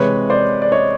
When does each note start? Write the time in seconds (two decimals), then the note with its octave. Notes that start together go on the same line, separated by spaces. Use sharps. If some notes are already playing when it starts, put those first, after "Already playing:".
Already playing: C3 E3 G#3 B4 C#5
0.30 C5 D5
0.62 D5
0.72 C#5 D#5